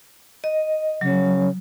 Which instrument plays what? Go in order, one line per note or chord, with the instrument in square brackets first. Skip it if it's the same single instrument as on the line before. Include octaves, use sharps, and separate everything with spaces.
[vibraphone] D#5
[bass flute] C#3 [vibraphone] F#3